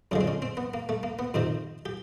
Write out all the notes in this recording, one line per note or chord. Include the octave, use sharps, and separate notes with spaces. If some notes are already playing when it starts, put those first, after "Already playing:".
F#2 D3 F3 G#3 C#4
C4
C#4
C4
B3
A#3
A3
A#3
B3
F2 C3 D#3 C4
G4